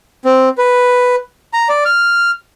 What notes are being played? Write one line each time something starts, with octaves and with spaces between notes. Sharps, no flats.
C4
B4
A#5
D5
F6